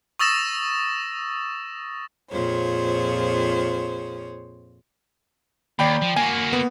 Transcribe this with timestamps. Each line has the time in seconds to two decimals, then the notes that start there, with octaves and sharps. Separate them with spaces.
0.19 C#6 D#6 E6 A6 A#6 E7
2.32 F2 A#2 G#4 C5 C#5
5.79 D#2 D5 G5 B5
6.02 F3
6.16 A#3 F#4 G#5
6.53 B3